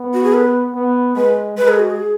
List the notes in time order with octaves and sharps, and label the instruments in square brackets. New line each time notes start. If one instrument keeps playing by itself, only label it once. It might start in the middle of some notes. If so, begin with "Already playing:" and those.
Already playing: [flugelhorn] B3
[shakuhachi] F#4
G#4
B4
[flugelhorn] B3
[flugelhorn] G#3 [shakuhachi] B4
[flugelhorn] G#3 [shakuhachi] B4
[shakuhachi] G#4
F#4
G#4